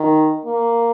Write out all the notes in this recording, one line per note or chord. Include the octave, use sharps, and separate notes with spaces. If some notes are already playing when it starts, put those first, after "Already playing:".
Already playing: D#3
A#3